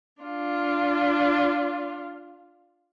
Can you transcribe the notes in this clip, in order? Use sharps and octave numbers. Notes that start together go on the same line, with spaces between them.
D4 F4